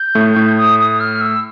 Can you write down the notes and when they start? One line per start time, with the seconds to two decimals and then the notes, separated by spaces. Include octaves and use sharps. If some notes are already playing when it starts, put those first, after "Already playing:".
Already playing: G6
0.15 A2 A3
0.36 A2 A3
0.57 D#6
0.79 D#6
1.00 F6
1.21 E6